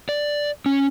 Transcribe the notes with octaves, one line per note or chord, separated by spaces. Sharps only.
D5
C#4